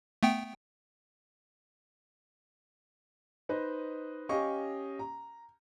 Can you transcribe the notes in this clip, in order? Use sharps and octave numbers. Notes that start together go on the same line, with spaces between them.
A3 B3 G5
D#4 B4 C5 D#5
C#4 G4 D#5 F5 G#5 C#6
A#5